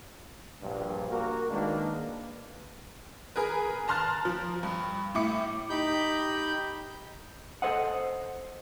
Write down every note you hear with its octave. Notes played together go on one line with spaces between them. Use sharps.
A#1 G2
A#3 F#4 A#4
D#3 G#3 A#3 D4 B4
G#4 A#4 B4
A5 A#5 C6 F6 F#6 A6
F3
G2
A2 E4 D6 C#7
D#4 G4 B5 G6
A4 C5 D#5 F#5